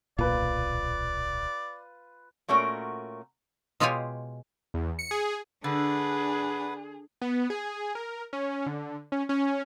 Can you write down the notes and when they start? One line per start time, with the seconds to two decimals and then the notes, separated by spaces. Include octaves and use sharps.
0.18 D1 B1 A#2 F4 B4 D5
2.48 A#2 A3 C#4 F#4 A#4
3.80 B2 G#3 F4 G4 C#5 G#5
4.74 E2
4.99 C#7
5.11 G#4
5.64 D3 D4 G#4 B4 F#5
7.21 B3
7.50 G#4
7.95 A#4
8.33 C#4
8.66 D3
9.12 C#4
9.29 C#4